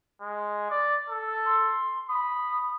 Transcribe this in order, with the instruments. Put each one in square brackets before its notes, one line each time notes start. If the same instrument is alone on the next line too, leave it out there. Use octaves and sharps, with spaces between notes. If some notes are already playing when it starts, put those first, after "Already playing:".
[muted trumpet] G#3
D5
A4
[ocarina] C6
[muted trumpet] B5 [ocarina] D#6